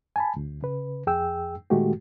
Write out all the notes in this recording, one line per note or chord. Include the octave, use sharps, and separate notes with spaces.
G#5 A5 B5
D2
C#3 B4
F2 G#4 G5 E6
A#2 D#3 G#3 A3 F#4 G4